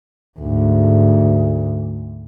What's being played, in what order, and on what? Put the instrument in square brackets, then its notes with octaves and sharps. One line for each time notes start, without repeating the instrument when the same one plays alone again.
[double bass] D2 G#2